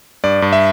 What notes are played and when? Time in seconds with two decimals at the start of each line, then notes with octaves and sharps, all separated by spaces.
0.24 G2 D5
0.42 G2
0.53 E5